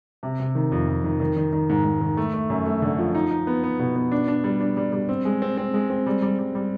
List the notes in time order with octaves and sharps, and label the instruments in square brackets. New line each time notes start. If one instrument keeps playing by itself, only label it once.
[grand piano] C3
C3
D#3
F2
F2
D#3
D#3
D#3
D#3
G#2
G#2
D#3
A3
A3
F#2
A3
D3
F3
D#4
D#4
B3
B3
B2
B3
D4
D4
G3
D4
G3
G3
C4
G#3
C4
C4
G#3
C4
G3
G3
G3
G3